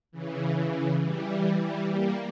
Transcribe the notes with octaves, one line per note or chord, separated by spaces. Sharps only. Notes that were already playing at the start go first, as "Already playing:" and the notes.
C#3 E3
E3 G3
E3 G3
G3 A#3